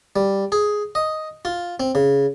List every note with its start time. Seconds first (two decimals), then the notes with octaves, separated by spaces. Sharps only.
0.16 G3
0.52 G#4
0.95 D#5
1.45 F4
1.80 C4
1.95 C#3